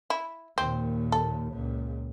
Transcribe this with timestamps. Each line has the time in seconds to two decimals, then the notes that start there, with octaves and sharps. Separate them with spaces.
0.10 E4
0.58 D#2 A#2 C4
1.12 A4
1.51 C#2 A#2